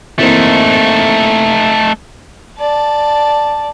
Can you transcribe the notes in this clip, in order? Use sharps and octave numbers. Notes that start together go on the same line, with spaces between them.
E3 A3 A#3 C4 D#4
D5 A5